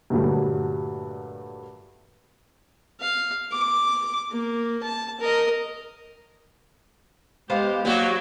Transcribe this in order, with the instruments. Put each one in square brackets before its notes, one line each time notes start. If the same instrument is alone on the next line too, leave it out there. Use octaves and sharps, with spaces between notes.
[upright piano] G2 A#2 D3 F#3 G3 A3
[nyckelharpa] F5
D6
A#3
A5
A#4 D#5
[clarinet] G#3 [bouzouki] B3 C5 F5 [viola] G4
[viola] F#3 [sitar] G3 F#4 [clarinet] A#3